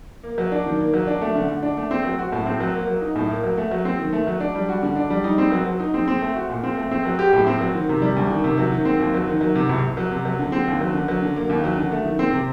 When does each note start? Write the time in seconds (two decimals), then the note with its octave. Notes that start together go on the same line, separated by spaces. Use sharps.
0.23 A#3
0.38 F#3
0.52 D4
0.66 D#3
0.79 A#3
0.94 F#3
1.07 D4
1.21 A3
1.35 D3
1.48 D3
1.63 D4
1.77 A3
1.91 C4
2.05 F#3
2.19 F#4
2.32 A2
2.46 C4
2.60 F#3
2.74 A#3
2.87 F#3
3.01 D#4
3.16 A2
3.30 A#3
3.44 F#3
3.58 A3
3.71 F#3
3.85 C4
3.99 D#3
4.13 A3
4.27 F#3
4.40 D4
4.55 G3
4.69 F#4
4.83 D3
4.96 D4
5.10 G3
5.24 D#4
5.38 C4
5.52 F#3
5.66 F#3
5.80 D#4
5.94 C4
6.08 C4
6.22 A3
6.36 F#4
6.50 A#2
6.63 C4
6.77 A3
6.91 C4
7.05 F#3
7.19 G4
7.33 A2
7.47 C4
7.61 F#3
7.75 D#3
7.89 C3
8.02 G3
8.16 D2
8.30 D#3
8.44 C3
8.58 F#3
8.72 D#3
8.85 C4
8.99 D#2
9.14 F#3
9.28 D#3
9.41 F#3
9.55 C3
9.69 C2
9.83 C2
9.97 F#3
10.12 C3
10.25 F#3
10.39 D3
10.52 C4
10.67 D#2
10.81 F#3
10.94 D3
11.08 F#3
11.22 D3
11.36 A#3
11.49 D#2
11.64 F#3
11.78 D3
11.92 A3
12.05 D#3
12.19 C4
12.33 C3